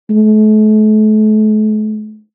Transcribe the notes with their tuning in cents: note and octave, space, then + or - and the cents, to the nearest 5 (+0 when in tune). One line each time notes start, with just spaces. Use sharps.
A3 -40